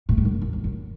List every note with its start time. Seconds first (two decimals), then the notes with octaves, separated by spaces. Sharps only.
0.09 A2
0.17 G2
0.25 F#2
0.42 F#2
0.53 E2
0.64 F#2